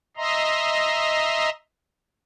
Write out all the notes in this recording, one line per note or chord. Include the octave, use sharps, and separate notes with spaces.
D#5 E5 A#5 C6